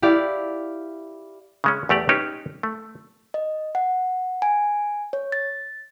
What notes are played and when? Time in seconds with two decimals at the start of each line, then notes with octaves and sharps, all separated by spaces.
0.02 E4 G4 D5 F5
1.64 C#3 G#3 C#4
1.89 E2 A3 G4 D5
2.09 C#4 D#4 G4 B4
2.63 A3
3.34 D#5
3.75 F#5
4.42 G#5
5.13 C#5
5.32 A6